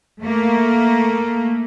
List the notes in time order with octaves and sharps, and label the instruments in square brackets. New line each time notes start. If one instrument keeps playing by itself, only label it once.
[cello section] A3 A#3